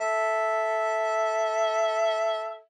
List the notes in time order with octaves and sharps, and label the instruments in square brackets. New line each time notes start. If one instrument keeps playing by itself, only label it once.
[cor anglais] A4 [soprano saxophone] E5